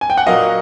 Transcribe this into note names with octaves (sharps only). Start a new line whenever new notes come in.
G#5
G5
F#5
A#2 F#3 A#3 D#5 F5